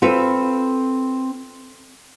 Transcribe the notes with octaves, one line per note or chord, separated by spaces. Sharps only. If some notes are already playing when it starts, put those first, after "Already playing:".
C4 F4 A4 B4